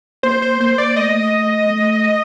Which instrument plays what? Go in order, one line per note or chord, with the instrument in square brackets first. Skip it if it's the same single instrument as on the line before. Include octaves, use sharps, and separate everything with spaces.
[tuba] A#3 [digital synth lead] C5
[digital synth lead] C5
[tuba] A#3 [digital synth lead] C5
[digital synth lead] D5
[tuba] A3 [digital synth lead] D#5
[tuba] A3